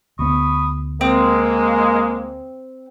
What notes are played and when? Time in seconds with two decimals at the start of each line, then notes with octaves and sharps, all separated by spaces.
0.19 D2 B3 B5 C#6 D#6
1.01 G#3 A#3 C4